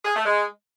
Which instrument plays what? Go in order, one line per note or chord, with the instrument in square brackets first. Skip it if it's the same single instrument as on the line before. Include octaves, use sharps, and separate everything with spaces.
[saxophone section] G#4
A3
G#3